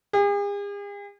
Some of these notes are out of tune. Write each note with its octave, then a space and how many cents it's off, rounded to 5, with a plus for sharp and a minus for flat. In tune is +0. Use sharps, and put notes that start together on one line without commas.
G#4 -45